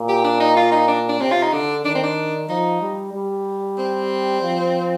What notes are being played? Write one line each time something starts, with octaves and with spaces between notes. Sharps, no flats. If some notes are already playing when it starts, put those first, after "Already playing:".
Already playing: A#2
G4
D4
D#4
F4
D#4
D4
D4
C3 C4
F4
D#4
D3 D4
D#3 D4
C4
D4
F3 D#4
G3
G3
C4
F3